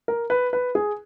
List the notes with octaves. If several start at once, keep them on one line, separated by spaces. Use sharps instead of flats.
A#4
B4
B4
G#4